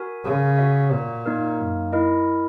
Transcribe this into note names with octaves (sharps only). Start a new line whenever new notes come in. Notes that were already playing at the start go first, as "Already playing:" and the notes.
Already playing: F#4 A#4 E5 G#5
C#3
F#4 C#5 E5
A#2
A#3 D#4 A#4
F#2
E4 A#4 D#5